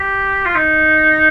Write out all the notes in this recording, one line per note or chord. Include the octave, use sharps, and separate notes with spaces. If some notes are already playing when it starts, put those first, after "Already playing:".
Already playing: G4
F4
D#4